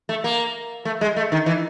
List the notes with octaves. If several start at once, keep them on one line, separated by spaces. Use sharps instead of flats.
A3
A#3
A3
G#3
A3
D#3
E3